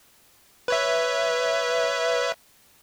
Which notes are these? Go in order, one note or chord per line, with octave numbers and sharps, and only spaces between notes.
B4 C#5 E5